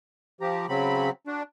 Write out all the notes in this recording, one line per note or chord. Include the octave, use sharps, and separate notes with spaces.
F3 G4 A#5
C#3 F#3 C4 B5
D4 F#4